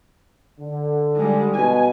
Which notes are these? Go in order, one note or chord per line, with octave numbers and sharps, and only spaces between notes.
D3
G3 G#3
B2 G#5